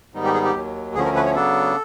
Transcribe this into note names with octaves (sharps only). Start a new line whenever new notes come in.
G#2 D#3 G3 B3 D#4
G4
G#4
G4
D#2 D#3 F#3
D2 D3 F3 A3 C#4 G#4
A#4
B4
C#5
C#3 F#3 B3 D4 A4